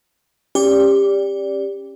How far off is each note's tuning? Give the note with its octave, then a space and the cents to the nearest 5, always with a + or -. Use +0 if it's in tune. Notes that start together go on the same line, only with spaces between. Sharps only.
C#4 -20 G4 +20 D5 -15